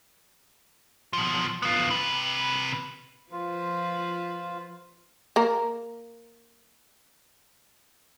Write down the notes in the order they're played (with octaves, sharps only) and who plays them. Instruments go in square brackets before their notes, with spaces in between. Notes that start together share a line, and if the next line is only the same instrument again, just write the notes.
[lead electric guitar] B2 F3
B3 F4
C3 B4
[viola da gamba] F3 B4 C5 [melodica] F4
[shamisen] A#3 A#4